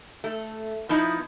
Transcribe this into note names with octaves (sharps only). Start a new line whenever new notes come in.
A3
F3 B3 D#4 E4